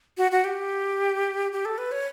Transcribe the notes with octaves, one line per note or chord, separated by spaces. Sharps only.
F#4
F#4
G4
G4
A4
B4
C#5